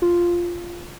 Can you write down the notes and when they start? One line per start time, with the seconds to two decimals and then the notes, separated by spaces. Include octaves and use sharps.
0.02 F4